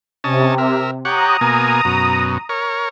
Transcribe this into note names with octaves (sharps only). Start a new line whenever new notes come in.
C3 C#4 D#5 A5
A#4 E5
G4 C#5 F#5 A#5 D#6
B2 A#3 G#5
F#2 B2
A#4 C#5